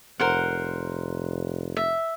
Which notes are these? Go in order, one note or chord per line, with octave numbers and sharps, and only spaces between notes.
F1 A#4 C5 F#5
E5